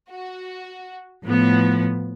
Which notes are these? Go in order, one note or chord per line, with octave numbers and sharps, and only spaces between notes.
F#4
A2 F3 B3